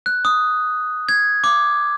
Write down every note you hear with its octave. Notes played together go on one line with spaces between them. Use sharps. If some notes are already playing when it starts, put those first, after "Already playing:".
F#6
D#6
G#6
D6